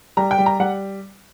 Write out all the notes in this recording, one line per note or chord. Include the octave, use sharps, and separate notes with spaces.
G3 A#5
G5
G3
A#5
G3 F#5